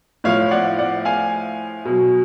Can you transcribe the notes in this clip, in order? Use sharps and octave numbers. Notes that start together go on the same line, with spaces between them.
A2 F3 C#5 F5
D5 F#5
D5 F#5
F5 G#5
B2 F#3